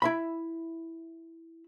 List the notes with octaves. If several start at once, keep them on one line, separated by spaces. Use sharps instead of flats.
E4 E5 B5